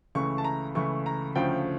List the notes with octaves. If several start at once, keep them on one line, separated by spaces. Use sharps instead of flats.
C#2 C#3 E3 A3 C#6
A5
A#5
C#2 C#3 E3 A3 C#6
A#5
D2 C#3 F3 A3 G5